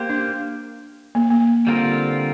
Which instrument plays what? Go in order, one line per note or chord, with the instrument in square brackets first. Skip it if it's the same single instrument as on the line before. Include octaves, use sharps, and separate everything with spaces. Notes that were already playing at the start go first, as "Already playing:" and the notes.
Already playing: [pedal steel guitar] A#3 G4 C5
[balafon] D4
A#3
A#3
[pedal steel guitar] D3 G3 C4 F4 A#4